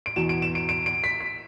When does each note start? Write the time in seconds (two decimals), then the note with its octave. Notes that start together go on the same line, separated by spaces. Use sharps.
0.06 D7
0.16 E2 B2 E7
0.29 D7
0.42 E7
0.55 D7
0.69 D7
0.86 D7
1.04 B6
1.21 B6